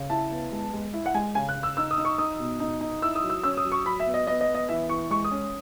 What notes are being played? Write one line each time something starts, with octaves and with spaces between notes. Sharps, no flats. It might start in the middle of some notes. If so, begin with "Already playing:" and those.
Already playing: C#3
E4 A5
B3
G#3
G#3
E4
F#5
G#3 G#5
C#3 G#5
F#6
C#3
E6
D#4 E6
D#6
D#4
C#6
D#4 D#6
B2
D#4
D#4
E4 E6
D#6
F#3
E6
C#4 E6
D#6
F#3
C#6
F#3 B5
E5
B3
D#5
B3 D#5
D#5
B3
D#5
E3 E5
E3 C#6
G#3 C#6
D#6
C#4